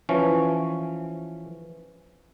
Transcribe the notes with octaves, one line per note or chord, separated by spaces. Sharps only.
E3 F3 C#4